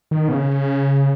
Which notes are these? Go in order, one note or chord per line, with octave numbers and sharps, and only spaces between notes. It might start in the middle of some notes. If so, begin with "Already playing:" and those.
D#3
B2
C#3